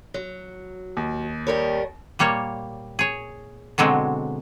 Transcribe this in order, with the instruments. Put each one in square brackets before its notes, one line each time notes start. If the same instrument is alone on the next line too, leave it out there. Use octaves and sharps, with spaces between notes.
[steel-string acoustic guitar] F#3
[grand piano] D#2
[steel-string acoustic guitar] G3 A#4 C#5
[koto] A#2 G3 A#3 C#5
G#4 C#5
B2 D3 F#3 G#3 C4